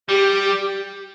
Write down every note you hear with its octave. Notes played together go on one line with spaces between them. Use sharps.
G3 G4